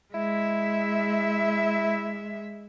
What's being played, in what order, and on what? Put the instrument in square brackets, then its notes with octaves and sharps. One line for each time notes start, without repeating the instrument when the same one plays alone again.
[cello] G#3 E5 [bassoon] E4